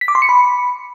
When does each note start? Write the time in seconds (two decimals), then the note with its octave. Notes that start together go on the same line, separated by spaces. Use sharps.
0.01 B6
0.08 D6
0.15 C6
0.22 C#7
0.29 B5